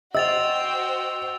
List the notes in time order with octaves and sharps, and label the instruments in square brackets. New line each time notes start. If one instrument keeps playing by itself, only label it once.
[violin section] F#4 C5 G5 [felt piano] D#5 [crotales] E6 A6 F7